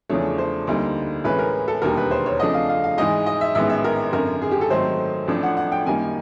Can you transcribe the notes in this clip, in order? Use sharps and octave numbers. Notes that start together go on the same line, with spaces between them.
E2 C#3 F3 A3 D4 C#5
C5
D2 D3 G3 A#3 D#4
A2 E3 G#3 C#4 B4
A#4
A4
E1 D#2 D3 G3 A#4
B4
C5
C#5
F2 C#3 F3 A3 D4 D#5
F5
F5
F5
G#2 E3 G#3 D#5
D#5
E5
A1 G#2 D#3 G#3 B3 E5
E5
A#4
G#1 F#2 D3 A#4
G#4
G4
A4
G#2 D#3 F#3 A3 C4 C5
A1 A2 F3 A3 D4
F#5
F#5
G5
F#2 D#3 G3 A#3 G#5